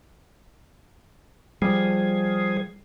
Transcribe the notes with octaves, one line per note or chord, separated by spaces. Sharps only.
F3 G3 G#4